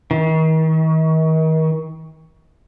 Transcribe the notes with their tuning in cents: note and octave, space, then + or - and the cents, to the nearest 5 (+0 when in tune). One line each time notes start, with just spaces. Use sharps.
D#3 +40